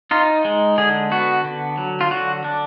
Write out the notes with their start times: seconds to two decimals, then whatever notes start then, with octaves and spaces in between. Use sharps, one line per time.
0.11 D#4 F4
0.45 G#3
0.78 D3 G#4
1.11 B3 F#4
1.44 D3
1.77 F#3
2.01 F4
2.11 D3 F#4
2.44 D4